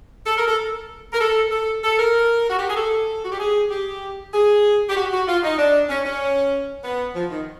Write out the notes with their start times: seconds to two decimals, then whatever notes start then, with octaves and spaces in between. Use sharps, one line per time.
0.26 A4
0.38 A#4
0.48 A4
1.13 A#4
1.21 A4
1.52 A4
1.84 A4
1.99 A#4
2.50 F#4
2.59 G4
2.69 G#4
2.77 A4
3.25 F#4
3.32 G4
3.40 G#4
3.71 G4
4.34 G#4
4.90 G4
4.96 F#4
5.12 F#4
5.27 F4
5.43 D#4
5.58 D4
5.89 C#4
6.05 C#4
6.84 B3
7.15 F3
7.30 D#3